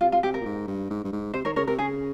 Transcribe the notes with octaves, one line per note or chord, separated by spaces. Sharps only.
C3 F4
F4
C3 G4
A#4
A#2
G#2
G2
G#2
G2
G#2
C3 C5
D#3 A#4 C#5
C#3 A#4 C#5
C3 A#4
C#3 G#4